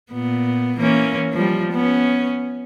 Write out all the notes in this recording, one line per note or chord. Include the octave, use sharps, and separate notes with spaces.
A#2 B3
E3 A#3 C#4
F3 G3
B3 C#4